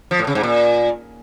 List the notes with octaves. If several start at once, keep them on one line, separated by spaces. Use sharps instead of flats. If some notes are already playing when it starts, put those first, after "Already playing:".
F3
A2
C#3
G#2
A#2